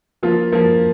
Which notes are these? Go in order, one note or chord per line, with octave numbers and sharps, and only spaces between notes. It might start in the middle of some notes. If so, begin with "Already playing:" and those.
F3 A#3 F4
F3 A#3 F4